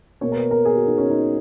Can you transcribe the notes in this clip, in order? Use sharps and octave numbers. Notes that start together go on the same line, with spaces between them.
B2 A#3 C#5
A#4
B4
A#4
G#4
F#4
D#4
C#4
D#4